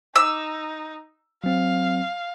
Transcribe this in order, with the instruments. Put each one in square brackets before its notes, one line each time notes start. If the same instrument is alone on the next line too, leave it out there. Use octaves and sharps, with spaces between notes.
[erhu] D#4 [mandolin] E6
[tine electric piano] F#3 C4 [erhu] F5